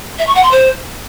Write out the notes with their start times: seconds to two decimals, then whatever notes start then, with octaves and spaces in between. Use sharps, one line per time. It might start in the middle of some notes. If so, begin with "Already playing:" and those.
0.19 E5
0.27 C#6
0.35 F#5
0.43 C6
0.51 C5